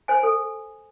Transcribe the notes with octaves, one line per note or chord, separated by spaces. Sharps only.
C5 G#5
A4